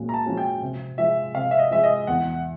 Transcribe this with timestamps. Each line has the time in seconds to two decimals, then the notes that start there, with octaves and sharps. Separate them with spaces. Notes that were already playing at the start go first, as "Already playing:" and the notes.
Already playing: A#2 F3 G#3 C#4 F#4
0.09 A#5
0.14 A5
0.26 F3 G#3 C#4 F#4
0.37 G5
0.62 C3
0.98 F3 G#3 E5
1.35 C3 F5
1.51 E5
1.59 D#5
1.71 F3 G#3 E5
1.84 D#5
2.07 E2 F#5